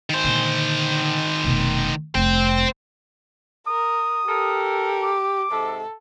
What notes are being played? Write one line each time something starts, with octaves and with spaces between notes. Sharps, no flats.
D#3 C5
A#2 D3
F1 B2
F1 F2 C5 G5
A#4 D#6
G4 A4 A#4
D6
G#2 C3 A4